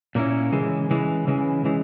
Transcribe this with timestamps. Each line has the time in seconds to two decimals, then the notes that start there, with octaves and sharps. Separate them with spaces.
0.15 A#2 A#3 C#4 E4
0.52 C#3 E3 G#3
0.90 C#3 E3 G#3
1.27 C#3 E3 G#3
1.65 C#3 E3 G#3